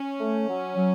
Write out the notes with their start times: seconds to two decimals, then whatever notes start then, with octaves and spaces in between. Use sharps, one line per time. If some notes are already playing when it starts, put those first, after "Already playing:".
Already playing: C#4
0.20 A3
0.48 F#3
0.76 F#3